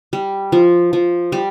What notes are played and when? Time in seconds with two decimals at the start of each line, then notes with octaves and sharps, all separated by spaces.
0.13 G3
0.52 F3
0.93 F3
1.32 G3